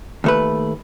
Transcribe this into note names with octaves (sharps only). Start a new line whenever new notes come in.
D#2 A3 B4